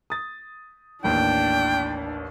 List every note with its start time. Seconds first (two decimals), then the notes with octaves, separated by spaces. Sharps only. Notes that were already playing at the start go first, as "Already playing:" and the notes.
0.10 D#6 A6
1.04 A1 D#2 D4 G5